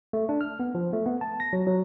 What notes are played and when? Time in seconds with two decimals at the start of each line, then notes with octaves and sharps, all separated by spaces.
0.13 A3
0.29 D4
0.41 F6
0.60 B3
0.75 F3
0.93 A3
1.06 B3
1.21 A5
1.40 A#6
1.53 F#3
1.67 F#3